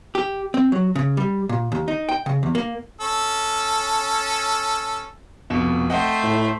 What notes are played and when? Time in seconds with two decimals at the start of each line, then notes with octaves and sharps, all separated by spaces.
0.15 G4
0.54 C4
0.72 F#3
0.96 C#3
1.17 G3
1.49 A#2
1.72 D#2
1.88 D#4
2.09 G5
2.26 C#3
2.43 E2
2.55 A#3
3.01 C#4 A4
5.50 F1 B2 E7
5.90 A3 C5 D#5 F#5 G5
6.23 A2